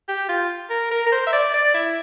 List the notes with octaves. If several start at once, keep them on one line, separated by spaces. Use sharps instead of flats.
G4
F4
A#4
A#4
A#4
C5
E5
D5
D5
E4